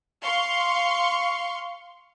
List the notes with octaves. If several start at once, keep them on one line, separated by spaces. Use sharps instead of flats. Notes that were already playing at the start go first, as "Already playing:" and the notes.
F5 C6 C#6